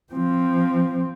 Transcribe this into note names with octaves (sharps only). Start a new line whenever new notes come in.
F3 C4